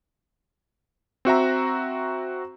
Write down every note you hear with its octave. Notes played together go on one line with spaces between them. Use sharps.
C4 F#4 E5 A#5